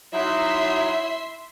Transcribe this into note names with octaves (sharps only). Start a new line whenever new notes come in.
F#3 D#4 E4 E5 C6